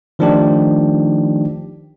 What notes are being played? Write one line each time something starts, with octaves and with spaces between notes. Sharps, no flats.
D#3 F3 A3 D4 D#4 G4